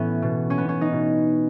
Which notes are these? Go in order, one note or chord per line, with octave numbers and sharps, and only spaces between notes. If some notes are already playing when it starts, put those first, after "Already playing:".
Already playing: A2 E3 B3 C#4
B2
C#4
B3
C#4
D#4
B2